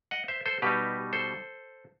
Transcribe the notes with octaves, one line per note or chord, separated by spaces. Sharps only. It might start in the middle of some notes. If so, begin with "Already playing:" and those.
D#5 F#5
C5 E5
A4 C5
B2 G3 D#4 G4 B4
A4 C5